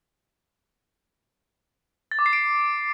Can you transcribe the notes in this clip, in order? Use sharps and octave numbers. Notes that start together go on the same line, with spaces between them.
A6
D6
C7
D7